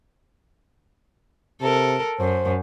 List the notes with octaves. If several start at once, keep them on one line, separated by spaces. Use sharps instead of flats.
C3 A4 A#4
F#2 C5